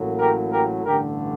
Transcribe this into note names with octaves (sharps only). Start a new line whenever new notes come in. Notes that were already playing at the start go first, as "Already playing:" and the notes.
Already playing: A1 A2 F#3 A#3
G4 A#4
G4 A#4
A1 G2 D3 A3 G4 A#4